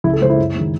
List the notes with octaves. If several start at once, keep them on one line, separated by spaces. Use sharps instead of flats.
C#2 E4
A4
C#3 G#3 C5
E4
F#2
D#3 G#3